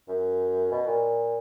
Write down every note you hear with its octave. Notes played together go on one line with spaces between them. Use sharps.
F#2
B2
A#2